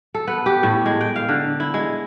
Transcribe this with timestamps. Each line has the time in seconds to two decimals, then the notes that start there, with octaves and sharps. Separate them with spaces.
0.15 A4
0.28 B3
0.46 G4
0.63 A2
0.86 G#3
1.01 G5
1.16 F5
1.29 D3
1.60 E4
1.74 G#3